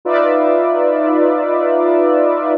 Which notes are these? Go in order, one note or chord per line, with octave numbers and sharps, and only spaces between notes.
D#4 F4 B4 D5 E5